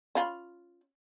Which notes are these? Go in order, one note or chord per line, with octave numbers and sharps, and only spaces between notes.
C#4 F4 B5